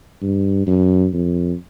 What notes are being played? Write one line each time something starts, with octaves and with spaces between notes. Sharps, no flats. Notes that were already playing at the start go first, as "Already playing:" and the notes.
G2
F#2
F2